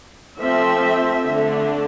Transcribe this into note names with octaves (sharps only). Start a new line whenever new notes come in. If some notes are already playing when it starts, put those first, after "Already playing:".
F3 A3 C4 E5
D3 A3 D4